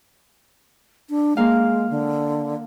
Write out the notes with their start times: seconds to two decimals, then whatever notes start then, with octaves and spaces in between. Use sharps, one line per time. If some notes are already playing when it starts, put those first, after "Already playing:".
1.10 D4
1.37 G#3 A#3 F5
1.90 D3